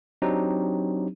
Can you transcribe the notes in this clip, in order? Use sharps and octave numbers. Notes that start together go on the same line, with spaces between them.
F#3 C4 D4 D#4 G4